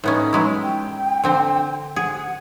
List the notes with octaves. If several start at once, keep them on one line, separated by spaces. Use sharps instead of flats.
A2 B3 C#4 D#4
F#3 G#3 E4
G5
D3 C4 C5
G#4 F#5